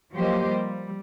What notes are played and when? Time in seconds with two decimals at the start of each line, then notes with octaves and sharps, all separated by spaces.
0.13 F3 F#3 A#3 G4 C5 D#5
0.49 G3